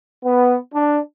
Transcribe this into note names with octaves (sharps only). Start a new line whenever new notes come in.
B3
D4